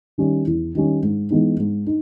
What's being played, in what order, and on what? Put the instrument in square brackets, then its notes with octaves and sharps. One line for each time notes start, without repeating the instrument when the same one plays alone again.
[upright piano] D#3 G3 C#4
E2
D#3 G3 C#4
G#2
E3 G#3 B3 D#4
G#2
D#4